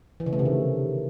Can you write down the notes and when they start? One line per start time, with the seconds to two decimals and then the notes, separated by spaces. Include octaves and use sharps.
0.20 E3
0.26 C#3
0.33 A3
0.39 C3
0.45 D#3